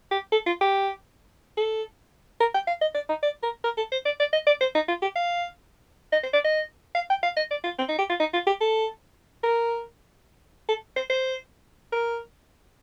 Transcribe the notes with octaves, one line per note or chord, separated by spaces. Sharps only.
G4
A4
F4
G4
A4
A#4
G5
F5
D#5
D5
D#4
D5
A#4
A#4
A4
C5
D5
D5
D#5
D5
C5
D#4
F4
G4
F5
D#5
C5
D5
D#5
F5
G5
F5
D#5
D5
F4
C4
D#4
G4
F4
D#4
F4
G4
A4
A#4
A4
C5
C5
A#4